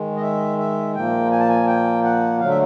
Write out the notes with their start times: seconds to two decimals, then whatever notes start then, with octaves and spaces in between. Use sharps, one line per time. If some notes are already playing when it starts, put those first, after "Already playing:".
Already playing: D#3 G#3
0.16 D#5
0.22 E5
0.59 E5
0.95 A#2 F3 A#3 G5
1.31 G#5
1.40 A5
1.49 G#5
1.67 G5
2.04 F#5
2.40 D3 F#3 A3 F5
2.49 E5